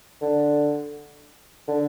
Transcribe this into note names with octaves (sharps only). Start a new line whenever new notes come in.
D3
D3